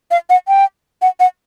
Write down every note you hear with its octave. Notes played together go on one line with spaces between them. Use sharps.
F5
F#5
G5
F#5
F#5